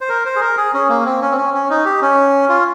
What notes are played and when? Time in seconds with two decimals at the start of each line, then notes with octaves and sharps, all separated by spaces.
0.01 C5
0.09 A#4
0.25 C5
0.36 G#4
0.41 A#4
0.57 G#4
0.74 C#4
0.89 A#3
1.05 C4
1.21 C#4
1.32 C4
1.38 C#4
1.54 C#4
1.70 D#4
1.85 G4
2.02 C#4
2.49 F4